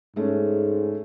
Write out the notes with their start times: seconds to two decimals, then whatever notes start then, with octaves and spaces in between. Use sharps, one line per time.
0.16 G#2 G#3 A3 C#4